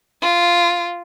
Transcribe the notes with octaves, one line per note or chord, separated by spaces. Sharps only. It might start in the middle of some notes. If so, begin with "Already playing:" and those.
F4